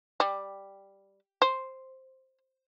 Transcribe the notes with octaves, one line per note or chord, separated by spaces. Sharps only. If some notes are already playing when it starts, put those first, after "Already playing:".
G3
C5